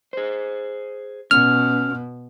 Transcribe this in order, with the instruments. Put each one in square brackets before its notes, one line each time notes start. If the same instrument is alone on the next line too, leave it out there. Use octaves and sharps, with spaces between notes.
[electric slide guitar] G#4 C5
[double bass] B2 [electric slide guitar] C#4 [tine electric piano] F6